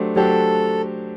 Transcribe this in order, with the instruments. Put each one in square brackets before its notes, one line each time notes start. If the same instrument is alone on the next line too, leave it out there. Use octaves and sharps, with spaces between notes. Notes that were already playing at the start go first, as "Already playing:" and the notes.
Already playing: [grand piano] F#3 A3 D4 G4 C5
[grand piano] F#3 A3 D4 G4 C5 [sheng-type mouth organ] A4